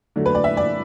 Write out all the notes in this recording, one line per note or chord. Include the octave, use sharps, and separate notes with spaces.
D3 F#3 A3
B4
D5
E5
D5